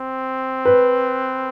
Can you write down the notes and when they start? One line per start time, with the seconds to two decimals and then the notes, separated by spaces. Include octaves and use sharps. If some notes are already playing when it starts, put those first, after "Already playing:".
Already playing: C4
0.65 B4